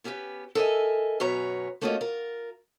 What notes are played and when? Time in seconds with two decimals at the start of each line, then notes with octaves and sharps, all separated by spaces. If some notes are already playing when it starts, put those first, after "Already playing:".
0.04 B3 C#4 G4 G#4 B4
0.55 A4 A#4 D#5 E5 G#5
1.20 F#2 B2 C#4 B4 C#5 A#5
1.81 A3 A#3 C#4 F4 F#4 D#5
2.01 F4 A#4